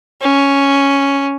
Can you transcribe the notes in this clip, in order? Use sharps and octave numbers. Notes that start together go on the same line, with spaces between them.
C#4